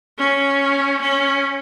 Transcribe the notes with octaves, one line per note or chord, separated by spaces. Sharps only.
C#4
C#4